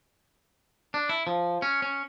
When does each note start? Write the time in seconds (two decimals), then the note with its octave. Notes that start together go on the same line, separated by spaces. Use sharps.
0.94 D4
1.09 E4
1.27 F3
1.62 C#4
1.82 C#4